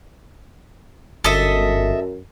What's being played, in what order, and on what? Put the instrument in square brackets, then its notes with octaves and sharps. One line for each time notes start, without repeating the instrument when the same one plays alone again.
[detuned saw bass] G1 [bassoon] F#2 [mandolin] A4 D#5 E5